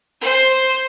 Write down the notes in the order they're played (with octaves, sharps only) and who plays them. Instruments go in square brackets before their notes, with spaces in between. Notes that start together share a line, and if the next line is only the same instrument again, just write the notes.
[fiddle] C5